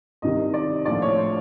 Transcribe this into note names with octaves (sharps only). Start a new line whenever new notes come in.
C2 C3 D#3 G3 D#5
D5
A#1 A2 F3 D5
C#5
C5